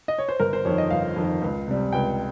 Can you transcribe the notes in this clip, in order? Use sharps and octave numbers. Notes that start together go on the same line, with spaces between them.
D#5
C#5
C5
G1 A#4
C5
F2 D#3 C#5
D#5
G1 F5
F2 D#3
C#2
C3 G3
C#2 G5